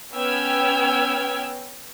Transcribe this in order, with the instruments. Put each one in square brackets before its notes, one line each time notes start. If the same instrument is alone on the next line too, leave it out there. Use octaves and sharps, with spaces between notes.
[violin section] B3 C#4 G5 E6 F6 G#6